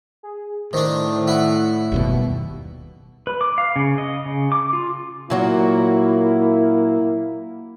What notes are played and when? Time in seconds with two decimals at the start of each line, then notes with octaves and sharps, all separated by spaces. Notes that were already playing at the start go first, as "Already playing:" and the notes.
0.23 G#4
0.73 A2 D#3 D4 C5
1.28 E4 F#5
1.92 F#1 D#2 B2 G3
3.27 B4
3.41 D6
3.58 F5
3.76 C#3
3.98 D#5
4.26 C#3
4.52 D6
4.73 F4
5.30 A#2 F#3 A#3 E4 F#4